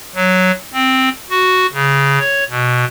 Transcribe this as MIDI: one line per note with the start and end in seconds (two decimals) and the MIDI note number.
0.15 0.51 54
0.73 1.09 60
1.30 1.66 66
1.73 2.19 49
2.19 2.44 73
2.50 2.85 47